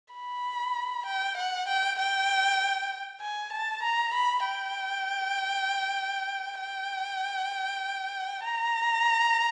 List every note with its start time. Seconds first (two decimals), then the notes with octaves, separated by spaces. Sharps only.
0.14 B5
1.06 G5
1.37 F#5
1.68 G5
1.99 G5
3.22 G#5
3.53 A5
3.83 A#5
4.14 B5
4.45 G5
6.60 G5
8.45 A#5